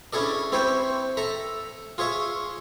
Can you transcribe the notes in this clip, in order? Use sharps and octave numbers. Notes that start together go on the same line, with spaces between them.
C#4 D4 E4 G#4 A4 D5
C4 E4 G4 C5 C#5
A4 E5 A#5
F4 G#4 C#5 E5